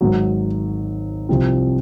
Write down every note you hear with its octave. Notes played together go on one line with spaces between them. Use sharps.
G#1 G#2 F#3
C2 C3 F3 C4 F4